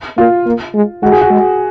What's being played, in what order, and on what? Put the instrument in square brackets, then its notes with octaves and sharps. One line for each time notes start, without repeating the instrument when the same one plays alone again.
[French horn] A#3 [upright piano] F4
[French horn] A#3
G#3
[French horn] G#3 [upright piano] F#4
[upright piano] G#4
F#4
[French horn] G#3